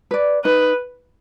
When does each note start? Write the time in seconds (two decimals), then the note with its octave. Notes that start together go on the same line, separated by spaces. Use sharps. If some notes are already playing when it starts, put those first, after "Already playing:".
0.11 B4 D5
0.44 D#4 B4